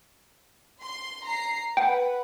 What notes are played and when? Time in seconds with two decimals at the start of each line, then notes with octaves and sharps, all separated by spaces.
0.82 C6
1.26 A#5 C7
1.77 B4 F#5 G5